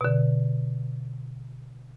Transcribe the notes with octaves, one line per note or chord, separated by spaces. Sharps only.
B2 D3